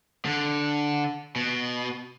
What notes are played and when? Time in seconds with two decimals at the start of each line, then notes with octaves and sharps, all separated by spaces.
0.25 D3
1.36 B2